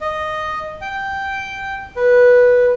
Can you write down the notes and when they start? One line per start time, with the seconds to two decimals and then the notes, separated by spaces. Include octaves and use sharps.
0.01 D#5
0.82 G5
1.96 B4